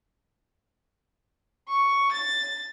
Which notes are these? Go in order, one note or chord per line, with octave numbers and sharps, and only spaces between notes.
C#6
A6